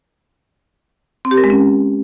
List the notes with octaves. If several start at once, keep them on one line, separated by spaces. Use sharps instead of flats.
C4
G4
A#4
G#3
C#4